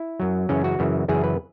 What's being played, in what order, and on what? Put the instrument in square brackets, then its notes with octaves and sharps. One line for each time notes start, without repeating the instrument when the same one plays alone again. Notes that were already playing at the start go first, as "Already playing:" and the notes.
Already playing: [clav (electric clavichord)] E4
F#2 F#3
F#2 C#3 E3 C#4
F#4
F#2 C#3 E3
F#2 C#3 E3 G#4
B4